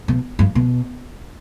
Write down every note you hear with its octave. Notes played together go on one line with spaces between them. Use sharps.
B2
G2
B2